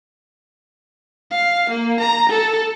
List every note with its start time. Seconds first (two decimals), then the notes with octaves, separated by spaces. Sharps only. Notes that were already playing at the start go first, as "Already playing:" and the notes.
1.31 F5
1.71 A#3
2.00 A#5
2.29 A4